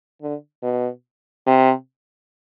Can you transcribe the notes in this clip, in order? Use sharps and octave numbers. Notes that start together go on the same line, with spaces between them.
D3
B2
C3